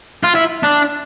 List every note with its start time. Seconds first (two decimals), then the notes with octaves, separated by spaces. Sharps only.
0.23 F4
0.35 E4
0.63 D4